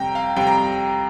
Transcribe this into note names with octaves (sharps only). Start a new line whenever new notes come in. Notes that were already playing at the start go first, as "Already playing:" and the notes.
Already playing: F2 C3 G3 G5 A#5
F5
F2 C3 G3 G5
A#5